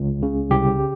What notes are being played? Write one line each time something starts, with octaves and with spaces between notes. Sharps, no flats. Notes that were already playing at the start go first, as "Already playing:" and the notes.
Already playing: C#2
C#3
C2 G4